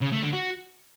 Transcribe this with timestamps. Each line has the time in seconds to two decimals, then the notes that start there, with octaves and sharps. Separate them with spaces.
0.01 C#3
0.12 A3
0.22 D3
0.33 F#4